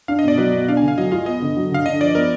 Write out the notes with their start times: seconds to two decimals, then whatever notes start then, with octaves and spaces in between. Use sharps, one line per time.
0.08 D4 F5
0.19 D#5
0.24 B2 D5
0.38 F#3 B4
0.53 B2 D#5
0.68 D4 F5
0.77 G#5
0.82 D3
0.88 F5
0.98 F#3 D#5
1.12 F4 F5
1.26 B3 D#5
1.42 D3
1.57 F#3
1.72 D3 F5
1.86 D4 D#5
2.01 F3 D5
2.15 B3 A#4